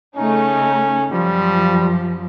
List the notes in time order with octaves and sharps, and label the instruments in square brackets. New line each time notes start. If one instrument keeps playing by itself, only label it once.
[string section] C#3 A3 D#4 [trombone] C#4
[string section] F#2 F3 [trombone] G3